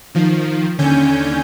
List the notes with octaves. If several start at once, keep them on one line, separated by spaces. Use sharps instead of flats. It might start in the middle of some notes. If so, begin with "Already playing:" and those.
D#3 F3
D#2 D3 C#4 G#5 G6